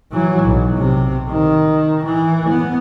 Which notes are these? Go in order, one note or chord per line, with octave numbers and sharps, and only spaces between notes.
E3 F#3
B1
C3
D#3
E3
B3